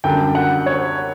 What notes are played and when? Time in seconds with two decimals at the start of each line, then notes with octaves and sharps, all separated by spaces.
0.04 F#2 D3 G3 D4 G5
0.35 F#5
0.66 C#5